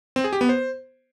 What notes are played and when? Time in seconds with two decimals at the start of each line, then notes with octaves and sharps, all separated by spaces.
0.16 C4
0.24 G#4
0.33 G4
0.41 B3
0.49 C5